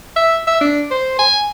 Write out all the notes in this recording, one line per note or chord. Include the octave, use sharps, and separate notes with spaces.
E5
E5
D4
C5
G#5